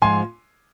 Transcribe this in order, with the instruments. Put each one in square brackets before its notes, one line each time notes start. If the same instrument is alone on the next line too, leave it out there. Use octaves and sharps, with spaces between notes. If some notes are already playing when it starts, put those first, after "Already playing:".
[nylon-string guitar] G#2 F3 G#3 [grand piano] G#5 C6